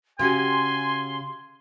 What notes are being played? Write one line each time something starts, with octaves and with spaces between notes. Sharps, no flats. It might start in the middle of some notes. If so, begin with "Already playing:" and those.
C#3 F#4 G4 G#5 C6